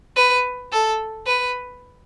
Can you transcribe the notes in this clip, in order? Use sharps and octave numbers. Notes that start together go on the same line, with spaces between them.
B4
A4
B4